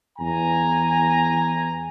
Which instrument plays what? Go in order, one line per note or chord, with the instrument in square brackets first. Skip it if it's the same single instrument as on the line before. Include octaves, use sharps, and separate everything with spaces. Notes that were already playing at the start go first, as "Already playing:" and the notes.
[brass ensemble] E2 G#5 A#5